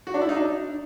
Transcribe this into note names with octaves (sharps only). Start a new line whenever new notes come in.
F#4
D4
E4
D#4
D4